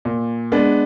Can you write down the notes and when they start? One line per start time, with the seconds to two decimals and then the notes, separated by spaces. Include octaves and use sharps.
0.05 A#2
0.52 G#3 B3 D4